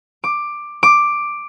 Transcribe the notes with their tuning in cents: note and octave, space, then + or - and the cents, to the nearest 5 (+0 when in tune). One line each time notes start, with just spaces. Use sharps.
D6 +10
D6 +5